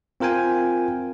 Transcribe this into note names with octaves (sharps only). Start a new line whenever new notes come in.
C4 F4 A#4 G5 G#5